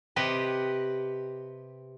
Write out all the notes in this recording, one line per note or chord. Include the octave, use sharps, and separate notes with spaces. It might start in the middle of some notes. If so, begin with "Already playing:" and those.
C3 G4 B4 D#5